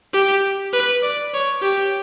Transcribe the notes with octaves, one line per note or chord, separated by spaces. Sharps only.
G4
B4
D5
C#5
G4